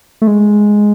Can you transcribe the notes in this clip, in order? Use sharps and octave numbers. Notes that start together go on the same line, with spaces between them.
A3
G#3